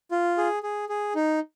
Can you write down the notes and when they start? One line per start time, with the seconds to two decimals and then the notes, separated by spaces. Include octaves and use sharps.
0.11 F4
0.38 G#4
0.63 G#4
0.89 G#4
1.15 D#4